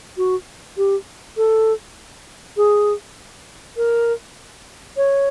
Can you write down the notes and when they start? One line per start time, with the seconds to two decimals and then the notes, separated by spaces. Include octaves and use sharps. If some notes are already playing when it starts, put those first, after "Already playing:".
0.17 F#4
0.77 G4
1.37 A4
2.57 G#4
3.77 A#4
4.97 C#5